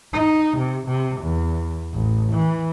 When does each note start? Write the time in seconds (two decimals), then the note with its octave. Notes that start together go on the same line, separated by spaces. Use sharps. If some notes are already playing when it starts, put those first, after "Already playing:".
0.13 D#4
0.58 C3
0.88 C3
1.21 E2
1.93 A1
2.33 E3